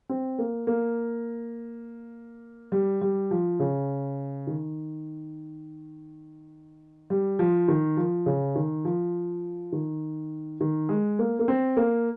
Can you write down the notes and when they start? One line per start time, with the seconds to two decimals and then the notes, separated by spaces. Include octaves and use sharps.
0.09 C4
0.39 A#3
0.67 A#3
2.72 G3
3.01 G3
3.31 F3
3.60 C#3
4.47 D#3
7.10 G3
7.39 F3
7.68 D#3
7.97 F3
8.26 C#3
8.55 D#3
8.85 F3
9.72 D#3
10.61 D#3
10.89 G#3
11.19 A#3
11.39 A#3
11.48 C4
11.77 A#3